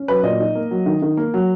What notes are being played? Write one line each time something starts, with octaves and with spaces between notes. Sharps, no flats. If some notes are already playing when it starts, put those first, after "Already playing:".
Already playing: C#4
F#3 B4
A#2 D#5
D#4
A#3
F#3
D#3
D#3
A#3
F#3